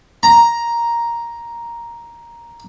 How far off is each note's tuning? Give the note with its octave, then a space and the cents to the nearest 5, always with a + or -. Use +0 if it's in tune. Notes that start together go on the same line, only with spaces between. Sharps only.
A#5 +5